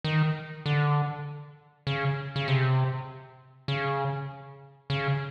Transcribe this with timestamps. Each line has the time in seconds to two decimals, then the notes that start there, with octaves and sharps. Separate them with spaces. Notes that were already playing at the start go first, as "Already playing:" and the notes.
0.04 D#3
0.66 D3
1.87 C#3
2.36 C#3
2.48 C3
3.68 C#3
4.90 C#3